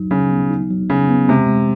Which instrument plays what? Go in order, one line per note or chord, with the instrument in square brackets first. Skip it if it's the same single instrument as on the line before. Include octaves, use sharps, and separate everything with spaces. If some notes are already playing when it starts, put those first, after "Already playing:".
Already playing: [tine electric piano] F#3 D#4
[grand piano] C#3 [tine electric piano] F#3
[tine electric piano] B3
D#4
F#3
[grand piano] C#3 [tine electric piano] B3
[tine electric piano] B3
[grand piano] C3 [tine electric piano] G#3
[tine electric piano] G#3